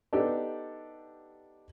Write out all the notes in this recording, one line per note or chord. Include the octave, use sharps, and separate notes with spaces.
B3 D4 D#4 G4 A4 D5